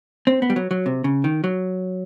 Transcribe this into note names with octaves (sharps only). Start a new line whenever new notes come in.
C4
B3
G3
F#3
F#3
C3
C#3
D#3
F#3